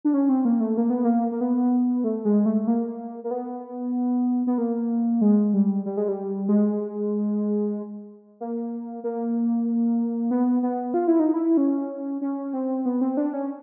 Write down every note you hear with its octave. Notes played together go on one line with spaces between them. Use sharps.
D4
C#4
C4
A#3
A3
A#3
B3
A#3
A#3
B3
A3
G#3
A3
A#3
A#3
B3
B3
A#3
G#3
G3
G3
G#3
G3
G#3
A#3
A#3
B3
B3
F4
E4
D#4
E4
C#4
C#4
C4
B3
C4
D4
C#4